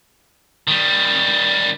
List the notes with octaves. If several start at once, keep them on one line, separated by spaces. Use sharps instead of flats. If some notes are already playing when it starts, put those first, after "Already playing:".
D#3 G3